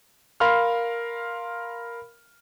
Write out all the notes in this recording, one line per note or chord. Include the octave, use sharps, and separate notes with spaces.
A#4 F5 B5 C6 F6